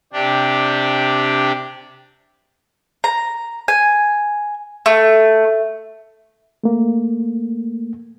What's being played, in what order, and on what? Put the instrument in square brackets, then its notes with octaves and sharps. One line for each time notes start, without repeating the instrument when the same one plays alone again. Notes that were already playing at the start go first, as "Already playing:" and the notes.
[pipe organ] C3 D4 G4
[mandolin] A#5
G#5
A3
[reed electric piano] A3 A#3